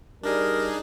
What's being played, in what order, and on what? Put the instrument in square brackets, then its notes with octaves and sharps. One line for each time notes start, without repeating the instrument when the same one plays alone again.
[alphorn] G3 [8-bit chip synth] D4 D#4 G#4 [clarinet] A#4